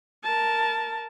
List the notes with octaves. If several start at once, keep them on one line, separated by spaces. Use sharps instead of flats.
A#4 A5